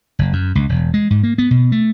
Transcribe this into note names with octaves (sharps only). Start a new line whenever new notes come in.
F#1
F#2
C#2
E1
G#3
G#2
A#3
B3
B2
A3